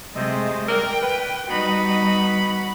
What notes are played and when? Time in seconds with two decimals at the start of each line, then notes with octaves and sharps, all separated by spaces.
0.15 C3 G#3 A3 C5 D#5
0.68 A#4 D5 G5
1.02 B4
1.48 G3 B3 D#4 F#4 B5